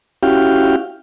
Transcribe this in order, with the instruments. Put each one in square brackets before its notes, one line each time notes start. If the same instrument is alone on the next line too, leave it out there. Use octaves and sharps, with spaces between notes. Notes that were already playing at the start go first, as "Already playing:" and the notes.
[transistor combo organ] C#4 E4 F#4 G4 F5 G5